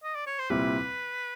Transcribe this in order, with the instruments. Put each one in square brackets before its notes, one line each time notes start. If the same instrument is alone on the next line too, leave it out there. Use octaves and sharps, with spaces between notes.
[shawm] D#5
D5
C#5
C5
[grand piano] C2 A#2 G3 C4 E4 [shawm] B4